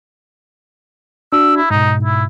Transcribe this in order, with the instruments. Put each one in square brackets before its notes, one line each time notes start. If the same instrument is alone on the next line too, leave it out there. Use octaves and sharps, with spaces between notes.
[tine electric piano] D4 F#4 [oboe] E6
[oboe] E4
[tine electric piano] G#2 B2 [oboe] D#4
[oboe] E4